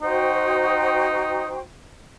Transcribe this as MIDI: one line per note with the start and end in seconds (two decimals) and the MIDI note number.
0.02 1.51 63
0.02 1.61 66
0.02 1.61 72
0.02 1.61 79